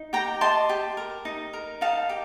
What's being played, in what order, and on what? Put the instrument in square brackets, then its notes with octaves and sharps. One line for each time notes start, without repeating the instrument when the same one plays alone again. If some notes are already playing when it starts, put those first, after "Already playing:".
Already playing: [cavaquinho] D#4
G4 G5 A#5
D#5 A5 C6
G4
A#4
D#4
A#4
D#4 F5 A5
G4